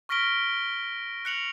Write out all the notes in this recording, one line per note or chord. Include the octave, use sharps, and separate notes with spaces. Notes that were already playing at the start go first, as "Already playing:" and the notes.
C#6 F6 A#6 B6 D7 G7
F#6 C#7 F7 F#7